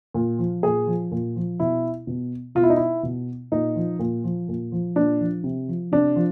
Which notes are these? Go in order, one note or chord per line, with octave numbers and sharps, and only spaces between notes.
A#2
F3
A#2 G#4
F3
A#2
F3
B2 E4
B2
B2 F4
E4
D#4
E4
B2
A#2 D#4
F3
A#2
F3
A#2
F3
A#2 D4
F3
C3
F3
C3 D4
F3